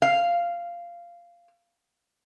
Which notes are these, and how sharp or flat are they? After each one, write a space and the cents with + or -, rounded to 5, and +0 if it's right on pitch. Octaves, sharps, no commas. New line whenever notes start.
F5 -10